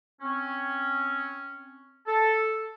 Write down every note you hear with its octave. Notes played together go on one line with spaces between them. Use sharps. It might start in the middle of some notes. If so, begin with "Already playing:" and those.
C4 C#4
A4